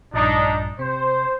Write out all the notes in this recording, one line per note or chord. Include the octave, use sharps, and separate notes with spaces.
A#1 G2 D4 D#4
C3 C5